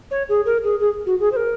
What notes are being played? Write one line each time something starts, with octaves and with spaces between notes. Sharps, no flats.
C#5
G#4
A#4
G#4
G#4
F#4
G#4
C5
A#4